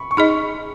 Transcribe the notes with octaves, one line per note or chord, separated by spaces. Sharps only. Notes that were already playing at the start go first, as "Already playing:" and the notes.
Already playing: B5 C#6
C#6
D#4 G#4 D#5 B5